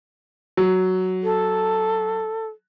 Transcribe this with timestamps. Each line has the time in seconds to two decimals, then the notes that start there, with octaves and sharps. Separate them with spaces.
0.57 F#3
1.23 A4